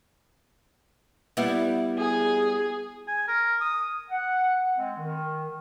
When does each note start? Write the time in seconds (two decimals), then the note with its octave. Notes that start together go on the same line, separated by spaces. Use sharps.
1.37 G3 B3 E4
1.98 G#4
3.08 G#5
3.28 A#4
3.61 D#6
4.11 F#5
4.77 G#3 C4
4.97 D#3